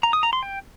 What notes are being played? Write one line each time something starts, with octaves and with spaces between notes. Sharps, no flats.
A#5
D#6
A#5
C6
G5